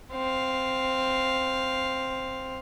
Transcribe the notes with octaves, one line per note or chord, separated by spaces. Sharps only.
C4 F5